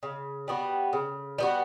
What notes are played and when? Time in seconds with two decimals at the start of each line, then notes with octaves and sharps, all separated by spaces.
0.03 C#3
0.48 G3 B3 F#4
0.93 C#3
1.38 G3 B3 F#4